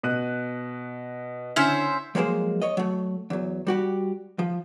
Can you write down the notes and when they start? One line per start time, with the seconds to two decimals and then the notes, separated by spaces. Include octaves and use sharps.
0.03 B2 F#6 D#7
1.56 D3 C#4 E4 C5 E5
2.15 F3 F#3 G#3 A#3 C5
2.62 C#5 D#5
2.77 F#3 A3
3.30 E2 F#3
3.67 G3 F#4 G4
4.39 F3